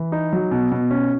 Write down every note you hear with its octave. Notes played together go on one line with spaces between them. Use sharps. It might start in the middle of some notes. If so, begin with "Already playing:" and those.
Already playing: E3
D#4
F#3
B2
B2
C#4